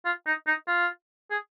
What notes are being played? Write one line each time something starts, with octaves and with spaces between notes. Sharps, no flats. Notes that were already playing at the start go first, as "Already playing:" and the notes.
F4
D#4
D#4
F4
G#4